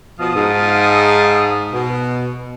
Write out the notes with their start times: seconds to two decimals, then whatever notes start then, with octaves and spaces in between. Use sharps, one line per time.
0.19 B2 F3 F5 A5 D#6
0.35 G#2
1.72 B2